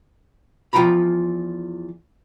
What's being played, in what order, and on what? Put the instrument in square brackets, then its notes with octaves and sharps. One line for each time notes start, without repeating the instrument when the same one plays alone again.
[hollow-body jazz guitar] E2 F3 F4 G5 A#5 B5